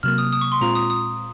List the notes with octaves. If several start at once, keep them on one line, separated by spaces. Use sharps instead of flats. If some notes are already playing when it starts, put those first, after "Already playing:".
C3 F#3 A#3 F6
D#6
D#6
C#6
C6
A#2 G#3 C4 F4 A#5
D#6
D#6